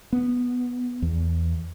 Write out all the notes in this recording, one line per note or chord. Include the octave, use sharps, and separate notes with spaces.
B3
E2